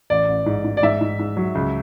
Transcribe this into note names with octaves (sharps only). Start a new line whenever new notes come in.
A1 D5
A1
G#2
G#2
D5
G#2 E5
G#2
G#2
F#3
C#2